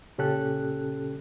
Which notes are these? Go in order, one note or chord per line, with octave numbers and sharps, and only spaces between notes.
A#2 C#3 C#4 G4 A4 F#6